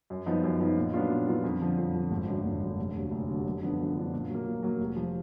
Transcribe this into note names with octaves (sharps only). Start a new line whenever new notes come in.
F#2
F3 B3 D#4
F#2
F3 B3 D#4
A#2
F#3 B3 D4 F4
A#2
F#3 B3 D4 F4
F2
D3 F3
F2
D3 F3
G#1
F#2 D3
G#1
F#2 D3
F1
D#2 D3 F#3
F1
D#2 D3 F#3
F#2
D3 F3 B3 D4
F#2
D3 F3 B3 D4
A#2
F#3
A#3
A#2
F#3 A#3
F1
F3